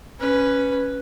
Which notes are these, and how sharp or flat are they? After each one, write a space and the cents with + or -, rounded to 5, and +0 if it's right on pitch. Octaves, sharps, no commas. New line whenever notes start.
C#4 +0 B4 +0